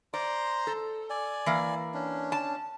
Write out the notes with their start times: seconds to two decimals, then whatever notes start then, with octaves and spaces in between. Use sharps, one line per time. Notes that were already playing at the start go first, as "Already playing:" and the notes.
0.14 C5 D5 A#5 C6
0.67 A4
1.10 D5 G#5
1.46 E3 A#3
1.94 C#4 D4
2.32 A5